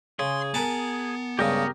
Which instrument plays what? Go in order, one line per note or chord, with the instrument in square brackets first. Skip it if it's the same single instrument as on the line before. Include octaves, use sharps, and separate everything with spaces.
[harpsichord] C#3 [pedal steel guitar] G#4 [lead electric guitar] C6
[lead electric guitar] B3 [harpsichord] A#4 G#5 A5
[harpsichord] C#2 G2 C#3 [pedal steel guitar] G4 A#4 D#6